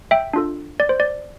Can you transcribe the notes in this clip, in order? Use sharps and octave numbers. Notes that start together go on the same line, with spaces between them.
E5 G5
D4 F4 A4
D5
C5
D5